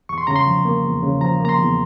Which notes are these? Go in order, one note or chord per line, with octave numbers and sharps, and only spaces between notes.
E2 C#6
C6
C#3 A#5
C6
F3
A#3
E2
C#3
F3 A#5
A#3 A#5
C6
E2